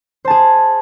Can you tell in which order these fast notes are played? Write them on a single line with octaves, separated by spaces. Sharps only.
C5 A5 G#4